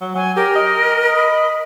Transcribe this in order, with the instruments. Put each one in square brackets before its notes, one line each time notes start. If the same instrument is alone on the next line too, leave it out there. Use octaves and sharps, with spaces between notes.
[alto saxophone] F#3
[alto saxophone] F#3 [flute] G#5
[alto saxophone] G4 [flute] A#4
[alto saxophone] D#5
[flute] B5